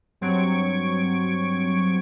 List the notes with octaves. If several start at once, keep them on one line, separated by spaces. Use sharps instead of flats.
G2 F#3 C4 C#6 G#6 D7